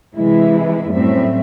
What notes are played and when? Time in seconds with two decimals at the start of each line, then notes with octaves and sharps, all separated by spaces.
0.15 C3 E3 G#3 E4
0.91 F#2 A2 G3 C4 E5